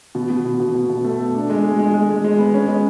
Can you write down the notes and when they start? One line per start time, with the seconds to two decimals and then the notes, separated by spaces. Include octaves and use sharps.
0.15 B2
0.30 B2
0.45 B2
0.60 B2
0.75 B2
0.90 B2
1.05 A3
1.20 A3
1.34 D4
1.50 G#3
1.64 G#3
1.79 G#3
1.94 G#3
2.09 G#3
2.24 G#3
2.39 B3
2.54 C#4
2.68 G#3